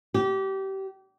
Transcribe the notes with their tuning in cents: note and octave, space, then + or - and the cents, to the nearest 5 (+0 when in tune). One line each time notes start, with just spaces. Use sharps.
G4 -25